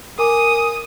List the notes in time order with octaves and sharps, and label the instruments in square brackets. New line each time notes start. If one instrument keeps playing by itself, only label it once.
[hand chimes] A#4 G#5 D6 [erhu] D#6